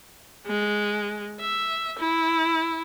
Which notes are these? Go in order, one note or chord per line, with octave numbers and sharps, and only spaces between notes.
G#3
E5
E4